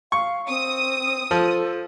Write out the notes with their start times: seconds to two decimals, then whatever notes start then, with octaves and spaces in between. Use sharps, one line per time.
0.12 F5 C#6
0.49 C4 D#6
1.31 F3 A4